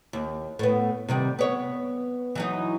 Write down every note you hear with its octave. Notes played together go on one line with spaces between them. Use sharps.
D#2
A2 B3
C3 D#3 G3
B3 C#5
E3 F#3 D#4